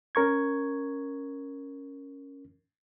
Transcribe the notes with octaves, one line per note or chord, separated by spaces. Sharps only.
C#4 A#4 C#6 G#6